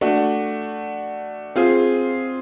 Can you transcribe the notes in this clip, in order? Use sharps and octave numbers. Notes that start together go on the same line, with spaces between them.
A3 D4 F#4
C4 F4 G#4